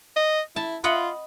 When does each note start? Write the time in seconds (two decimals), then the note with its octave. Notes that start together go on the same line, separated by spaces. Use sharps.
0.16 D#5
0.56 E4 A5
0.84 F4 D#5 F#5 B5